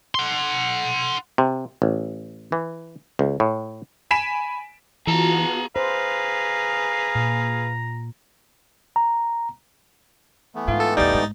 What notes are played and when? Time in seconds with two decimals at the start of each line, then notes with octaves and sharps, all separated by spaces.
0.15 F#5 C6
1.38 C3
1.82 A1
2.52 E3
3.19 C#2
3.40 A2
4.11 G#5 B5 B6 D7 E7
5.07 E3 B3 F4 F#4 G#4 A5 A#5
5.76 G#4 B4 C5 F5 A#5
7.15 A#2
8.96 A#5
10.55 E3 A3 B3
10.68 G#2 F4
10.80 A4
10.97 A#1 E2 G3 D#4 A6
11.11 G1 G#2